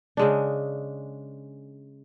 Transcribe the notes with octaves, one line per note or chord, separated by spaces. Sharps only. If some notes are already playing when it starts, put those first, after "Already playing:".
C#3 G#3 D4